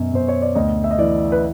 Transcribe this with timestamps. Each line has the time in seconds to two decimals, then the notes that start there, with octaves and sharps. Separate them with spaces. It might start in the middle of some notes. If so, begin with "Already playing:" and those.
Already playing: F#2 B2
0.13 B2 C5
0.28 C#5
0.42 D5
0.55 D2 D#5
0.84 E5
0.91 D#5
0.98 E3 D5
1.32 B4